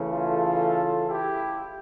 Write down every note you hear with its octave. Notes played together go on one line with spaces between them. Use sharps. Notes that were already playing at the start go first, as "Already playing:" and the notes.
Already playing: C#3 E3 A3
F4 A4
E4 G4